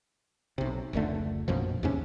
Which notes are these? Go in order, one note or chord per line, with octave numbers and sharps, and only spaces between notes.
B1 C3
F1 C#2 D3 A3
A#1 F#2 B2 F3
D#2 G#2 C3 C#4